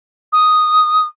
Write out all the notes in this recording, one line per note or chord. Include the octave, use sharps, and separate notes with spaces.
D#6